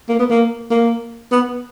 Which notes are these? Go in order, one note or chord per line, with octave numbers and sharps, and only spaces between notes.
A#3
B3
A#3
A#3
B3